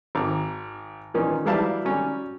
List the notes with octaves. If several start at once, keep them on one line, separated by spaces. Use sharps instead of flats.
G#1 D6
A#2 D#3 E3 C#4
E3 F#3 G3 E4 F5 A5
F#3 G3 C#4